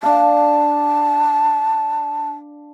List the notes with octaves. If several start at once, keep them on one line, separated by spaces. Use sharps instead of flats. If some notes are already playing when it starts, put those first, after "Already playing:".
D4 F5 A5